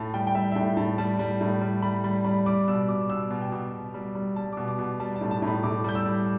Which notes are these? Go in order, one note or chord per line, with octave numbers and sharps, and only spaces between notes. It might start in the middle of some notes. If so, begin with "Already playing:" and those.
Already playing: A2 A5
G3 G5
G5
G3 E5
E5
A2 G5
A2 A5
G3 A5
G3
A2
G3
G3 B5
G3 B5
G3 B5
G3 D6
B2 E6
B2 D6
B2 E6
B2
G5
B2
B2
G3
G3
G3 A5
B2 D6
D6
B2
G3 A5
A5
A2
A5
A2
B5
A2 D6
G3 G6
E6
G3